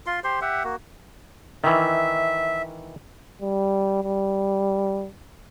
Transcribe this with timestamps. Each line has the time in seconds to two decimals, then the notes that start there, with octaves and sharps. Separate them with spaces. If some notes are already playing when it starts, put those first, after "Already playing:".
0.06 F4 C6
0.24 G4 C5 C6
0.41 G4 E5 F#5
0.64 A#3 F#4
1.64 D#3 E3 E5
3.42 G3
4.03 G3